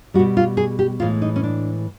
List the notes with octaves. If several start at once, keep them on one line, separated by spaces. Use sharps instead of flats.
G3 F#4
B2
F4
G#4
G4
A2 E3 G#3 F4
D#4
C#4
D4